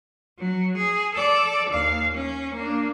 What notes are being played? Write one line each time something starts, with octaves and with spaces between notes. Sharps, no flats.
F#3
G#4
A4 D5
D#2 F5
C#4
A#3 D4